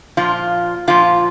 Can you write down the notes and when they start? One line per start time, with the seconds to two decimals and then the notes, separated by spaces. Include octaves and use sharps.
0.17 A#2 F3 F4
0.87 A#2 F3 F4